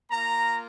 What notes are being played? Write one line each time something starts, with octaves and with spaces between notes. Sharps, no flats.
A#3 F4 A#5